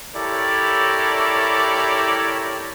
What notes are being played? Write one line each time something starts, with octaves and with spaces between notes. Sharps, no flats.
E4 G4 A4 A#4 C#5 D5